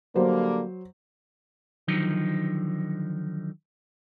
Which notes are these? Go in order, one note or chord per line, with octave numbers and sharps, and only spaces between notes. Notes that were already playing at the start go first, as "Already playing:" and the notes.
D3 F#3 G3 A#3 C5
D3 D#3 F3 F#3 D#4